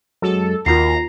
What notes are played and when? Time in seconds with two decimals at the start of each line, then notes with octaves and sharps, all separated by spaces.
0.22 F#2 F#3 G#3 A4
0.66 D#2 F4 F#4 A#4 A#5 C7